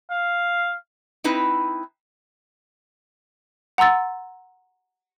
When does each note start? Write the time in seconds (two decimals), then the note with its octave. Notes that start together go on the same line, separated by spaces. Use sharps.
0.11 F5
1.24 C4 D#4 E4 B4
3.78 F#5 A#5 C6 E6 A6